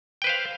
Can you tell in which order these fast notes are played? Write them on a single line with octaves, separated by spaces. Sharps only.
G5 B4 C5 F5